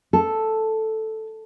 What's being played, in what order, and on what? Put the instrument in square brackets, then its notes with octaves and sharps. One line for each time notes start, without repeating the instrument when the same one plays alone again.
[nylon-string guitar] A4